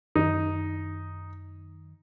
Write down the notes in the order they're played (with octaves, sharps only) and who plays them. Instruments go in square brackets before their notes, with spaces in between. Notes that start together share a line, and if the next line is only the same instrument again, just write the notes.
[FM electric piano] F#2 D#3 [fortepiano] D#4